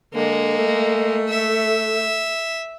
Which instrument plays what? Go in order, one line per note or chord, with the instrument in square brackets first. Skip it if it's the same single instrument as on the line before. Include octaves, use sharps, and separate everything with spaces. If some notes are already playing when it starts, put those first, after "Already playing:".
[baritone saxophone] D3 [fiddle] G#3 A#3
[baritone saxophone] A3
[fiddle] E5